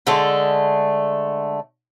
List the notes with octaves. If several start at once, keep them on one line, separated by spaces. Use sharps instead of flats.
D3 G#3 A3 D5